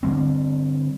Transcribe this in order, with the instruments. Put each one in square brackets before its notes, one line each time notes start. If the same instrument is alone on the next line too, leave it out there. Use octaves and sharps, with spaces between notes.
[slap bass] D3 G3 C4